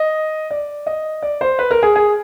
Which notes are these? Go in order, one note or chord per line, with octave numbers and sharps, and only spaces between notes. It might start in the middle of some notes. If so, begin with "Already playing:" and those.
Already playing: D#5
D5
D#5
D5
C5
B4
A#4
G#4
G#4